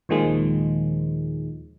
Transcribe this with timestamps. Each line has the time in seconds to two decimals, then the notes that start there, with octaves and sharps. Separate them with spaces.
0.09 D#2 A#2 D#3 F3 G#3